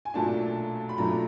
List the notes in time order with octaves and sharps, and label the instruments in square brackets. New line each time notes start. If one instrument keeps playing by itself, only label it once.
[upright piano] G#5
B1 A#2 F#3 A3 D4 A5
B5
B1 A#2 F#3 A3 D4 A#5